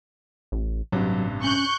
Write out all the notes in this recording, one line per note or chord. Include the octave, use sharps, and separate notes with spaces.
A1
A1 G2 C3 F#3
C#4 C#6 F#6 G6